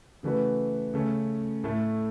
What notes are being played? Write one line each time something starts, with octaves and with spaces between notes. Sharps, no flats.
C#3 E3 A3 F#4 B4
C#3 A3 C#4
A2 A3 E4 A4